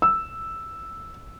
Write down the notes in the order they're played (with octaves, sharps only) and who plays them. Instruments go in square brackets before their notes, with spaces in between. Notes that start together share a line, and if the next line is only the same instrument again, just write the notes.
[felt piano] E6